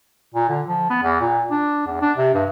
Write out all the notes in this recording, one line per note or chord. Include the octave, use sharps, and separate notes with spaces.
A#2
D3
F3
B3
E2
A#2
D4
E2
D4
C3
G2